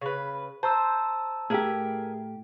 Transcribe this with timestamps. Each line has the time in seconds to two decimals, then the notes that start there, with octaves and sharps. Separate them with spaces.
0.01 C#3 B4
0.63 C5 A5 A#5 E6
1.50 A2 G4 G#4 A#4 E5